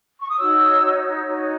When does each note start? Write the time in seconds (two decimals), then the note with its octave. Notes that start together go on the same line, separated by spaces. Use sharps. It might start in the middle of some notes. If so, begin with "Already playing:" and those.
0.20 C#6
0.28 D#6
0.37 D#4 F#4 C#5 E6
1.24 D#4 F#4 C#5